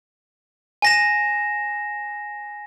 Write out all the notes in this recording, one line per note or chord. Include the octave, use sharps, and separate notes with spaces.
G#5 A#6 E7